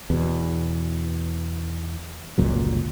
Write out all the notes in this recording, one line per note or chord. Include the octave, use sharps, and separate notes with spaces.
E2 B2
G1 C#2 A#2 F#3